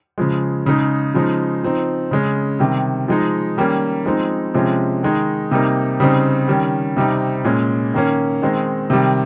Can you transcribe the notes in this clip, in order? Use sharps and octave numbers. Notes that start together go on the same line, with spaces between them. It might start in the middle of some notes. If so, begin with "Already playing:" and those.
C#3 F3 G#3
C#3 G#3 D#4
C#3 F3 G#3 D#4
F3 C4 D#4
C#3 G#3 C#4
C3 D#3 G3
F3 G#3 D#4
D#3 G3 A#3 C#4
F3 G#3 C4 D#4
C3 F3 G#3 C#4
D#3 G#3 D#4
C3 G3 A#3 D#4
C#3 G3 C4 D#4
D#3 G3 C#4
C3 G3 C4 D#4
A#2 G#3 C#4
D#3 A#3 C#4
D#3 G#3 C4 D#4
C3 D#3 G3